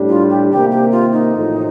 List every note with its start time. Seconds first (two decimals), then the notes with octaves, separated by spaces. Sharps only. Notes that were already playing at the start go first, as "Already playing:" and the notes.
Already playing: A2 G3 D4
0.09 F4
0.30 G4
0.50 C3 D#3 A#3 G4
0.71 G4
0.92 F4
1.13 D#4
1.33 A1 A2 F3